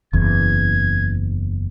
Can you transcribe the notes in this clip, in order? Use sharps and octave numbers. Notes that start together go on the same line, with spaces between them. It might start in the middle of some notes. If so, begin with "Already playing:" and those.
F#1 E2 G#6